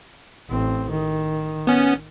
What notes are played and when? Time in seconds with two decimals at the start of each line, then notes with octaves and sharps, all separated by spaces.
0.50 A1 C4
0.90 D#3
1.67 B3 C#4